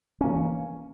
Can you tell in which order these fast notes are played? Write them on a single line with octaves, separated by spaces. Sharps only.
C#4 A#3 E3